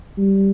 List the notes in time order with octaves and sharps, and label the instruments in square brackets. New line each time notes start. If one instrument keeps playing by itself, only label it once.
[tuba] G3